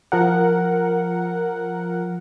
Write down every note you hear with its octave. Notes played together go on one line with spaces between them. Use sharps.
F3 A#4 F#5